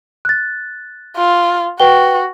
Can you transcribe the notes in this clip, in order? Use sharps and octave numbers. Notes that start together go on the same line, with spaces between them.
F#6 A6
F4
F#4 B4 G5 G7